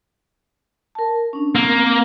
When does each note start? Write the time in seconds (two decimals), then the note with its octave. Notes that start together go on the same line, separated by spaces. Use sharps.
0.95 A#4 A5
1.33 C#4 D4
1.55 A#3 C4